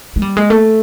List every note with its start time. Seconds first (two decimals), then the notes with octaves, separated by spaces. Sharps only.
0.16 G#3
0.22 G3
0.37 G#3
0.50 A3